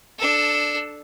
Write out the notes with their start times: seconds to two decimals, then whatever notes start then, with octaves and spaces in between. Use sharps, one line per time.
0.18 D4 A4